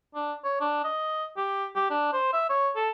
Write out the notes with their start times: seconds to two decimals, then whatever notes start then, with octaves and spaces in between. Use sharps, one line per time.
0.15 D4
0.44 C#5
0.60 D4
0.84 D#5
1.37 G4
1.76 G4
1.90 D4
2.13 C5
2.33 E5
2.50 C#5
2.76 A4